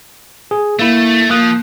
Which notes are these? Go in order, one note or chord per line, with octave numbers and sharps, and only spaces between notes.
G#4
A3 A#3 E4
F3 A#3 D#6 F#6